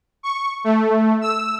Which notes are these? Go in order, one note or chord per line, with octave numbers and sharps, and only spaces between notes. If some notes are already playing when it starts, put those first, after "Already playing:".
C#6
A3
E6